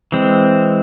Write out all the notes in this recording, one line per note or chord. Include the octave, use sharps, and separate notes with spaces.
E3 G#3 C4